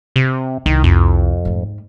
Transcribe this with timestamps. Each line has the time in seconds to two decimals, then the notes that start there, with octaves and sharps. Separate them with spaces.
0.16 C3
0.66 C2 D#3
0.84 F2
1.45 G#2 A3